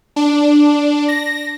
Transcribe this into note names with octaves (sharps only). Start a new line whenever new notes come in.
D4
A#6